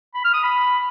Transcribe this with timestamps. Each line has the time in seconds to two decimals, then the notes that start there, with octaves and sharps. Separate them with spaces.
0.15 B5
0.24 F6
0.34 D#6
0.43 B5